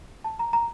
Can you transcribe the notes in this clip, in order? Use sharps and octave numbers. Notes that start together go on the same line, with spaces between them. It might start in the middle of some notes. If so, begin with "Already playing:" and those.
A5
A#5
A#5